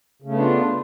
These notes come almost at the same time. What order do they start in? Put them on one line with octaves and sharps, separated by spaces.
C#3 A3 B3 D4 F4